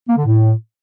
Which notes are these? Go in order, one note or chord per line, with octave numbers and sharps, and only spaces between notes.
A#3
D3
A2